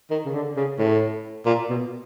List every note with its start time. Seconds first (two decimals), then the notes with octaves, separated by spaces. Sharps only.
0.11 D#3
0.25 C#3
0.34 D3
0.57 C#3
0.79 A2
1.46 A#2
1.69 B2